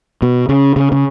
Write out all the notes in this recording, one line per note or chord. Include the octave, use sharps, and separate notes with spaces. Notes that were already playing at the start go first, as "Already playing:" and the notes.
B2
C#3
C#3
C#3